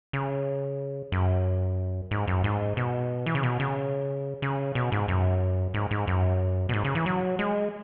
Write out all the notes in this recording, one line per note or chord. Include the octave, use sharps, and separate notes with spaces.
C#3
F#2
G#2
F#2
G#2
B2
E3
C#3
B2
C#3
C#3
B2
G#2
F#2
G#2
G#2
F#2
B2
G#2
C#3
E3
F#3
G#3